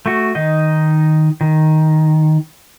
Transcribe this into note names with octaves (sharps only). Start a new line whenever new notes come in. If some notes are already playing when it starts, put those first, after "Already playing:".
A3 F#4
D#3 D#4 D#5
D#3